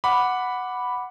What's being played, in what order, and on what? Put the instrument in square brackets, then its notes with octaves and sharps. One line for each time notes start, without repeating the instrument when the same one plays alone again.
[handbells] F#5 D6 [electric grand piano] B5